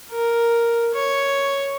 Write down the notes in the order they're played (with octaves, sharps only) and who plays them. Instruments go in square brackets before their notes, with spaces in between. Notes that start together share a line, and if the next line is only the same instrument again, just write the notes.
[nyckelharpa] A#4
C#5